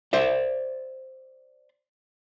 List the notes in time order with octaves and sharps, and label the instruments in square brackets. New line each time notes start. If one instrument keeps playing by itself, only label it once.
[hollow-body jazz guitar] C5 D5 E5